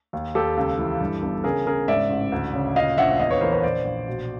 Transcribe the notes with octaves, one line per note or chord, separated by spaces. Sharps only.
D#2
D#2 G4 A4
C#2
E3
G2
G1
C#3 G#4 A#4
C#3 G#4 A#4
G#2 D5 E5
A1
D2
C#3
A#2 D#5 F5
A#1 E5 F#5
E2 D#5 F5
B4 C#5
E3 A#4 C5
B4 C#5
A#1 C5 D5
A#1
B2